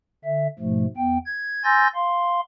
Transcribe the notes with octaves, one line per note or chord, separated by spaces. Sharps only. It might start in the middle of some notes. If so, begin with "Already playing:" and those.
D3 E5
G#2 B2 F3 A3
E2 B3 G5
G#6
G#5 C6 E6 G6 A6 A#6
F5 C6